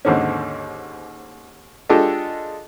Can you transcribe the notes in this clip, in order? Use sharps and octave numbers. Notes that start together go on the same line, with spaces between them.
D#2 G#2 D3 C4 C#4
G#3 D4 F4 G4 A4 D#5